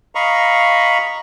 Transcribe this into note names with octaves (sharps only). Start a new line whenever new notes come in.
D#5 F5 A#5 B5 C#6